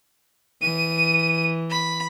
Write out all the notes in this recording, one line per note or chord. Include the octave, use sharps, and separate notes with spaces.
E3 D#7
B5